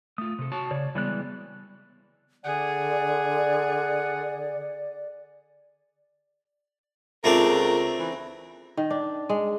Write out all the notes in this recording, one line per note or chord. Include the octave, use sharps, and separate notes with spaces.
A3 F4 D#6
C3 A4
F#4 C#5 A5
C#3 C#5 D5
E3 G3 G#3 B3 D5 F#6
D3 G#4 D5 F#5
C#2 A3 C4 D4 F4 A#4 F7
E3
D#3
D4
G#3